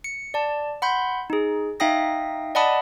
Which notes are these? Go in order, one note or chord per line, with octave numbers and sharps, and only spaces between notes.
C#7
D5 A5
F#5 B5 C6 G6
D#4 G#4
D#4 E5 F5 G5 D#6 A#6
D5 D#5 F#5 A5 B5 D#6